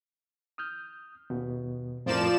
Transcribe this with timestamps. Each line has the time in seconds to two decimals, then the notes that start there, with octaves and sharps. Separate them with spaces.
0.58 D#6 F6 G6
1.30 D#2 B2
2.06 F2 A2 F3 A#4 D5 E7